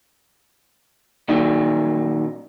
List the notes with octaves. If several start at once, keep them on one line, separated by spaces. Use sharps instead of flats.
A#2 D#3 F#3 D#4